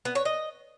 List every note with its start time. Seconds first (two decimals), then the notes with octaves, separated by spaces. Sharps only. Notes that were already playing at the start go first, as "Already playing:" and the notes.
0.05 B3
0.15 C#5
0.25 D#5